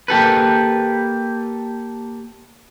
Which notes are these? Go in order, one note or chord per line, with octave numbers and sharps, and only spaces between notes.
A#3 G4 A4 B4